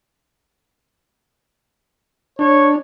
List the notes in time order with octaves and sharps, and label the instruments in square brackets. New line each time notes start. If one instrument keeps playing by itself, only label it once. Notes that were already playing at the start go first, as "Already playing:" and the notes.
[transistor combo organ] D4 [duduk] C#5